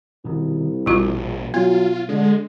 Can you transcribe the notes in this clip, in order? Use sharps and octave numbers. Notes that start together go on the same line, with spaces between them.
C2 B2 D#3
A#1 B2 G3 F4 F#4
F#3 B3 F4
D3 G#3